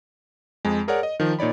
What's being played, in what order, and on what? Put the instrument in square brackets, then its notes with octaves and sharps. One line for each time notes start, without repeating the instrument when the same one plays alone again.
[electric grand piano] F2 G#3
G#4 A#4 C#5 D5 F#5
D#5
D#3 F3
A#2 D#4 C#5 D5 B5